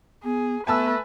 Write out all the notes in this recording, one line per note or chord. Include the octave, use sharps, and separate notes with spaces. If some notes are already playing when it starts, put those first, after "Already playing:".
B3 G#4
A3 B3 B4 G#5 A5 E6